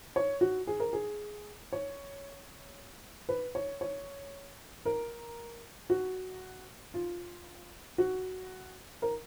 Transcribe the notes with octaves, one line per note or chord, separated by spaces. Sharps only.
C#5
F#4
G#4
A#4
G#4
C#5
B4
C#5
C#5
A#4
F#4
F4
F#4
A#4